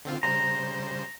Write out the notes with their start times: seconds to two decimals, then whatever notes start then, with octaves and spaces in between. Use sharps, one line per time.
0.05 D3 C4 F4
0.23 C#3 G3 C5 A#5